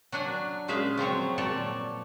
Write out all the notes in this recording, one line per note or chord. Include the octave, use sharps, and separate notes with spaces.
F#3 D4 F#5 G#5
A#2 G#3 C#4 G#4 E5 F5
F3 F#3 C4 C#5
A#2 C#5 D5 A5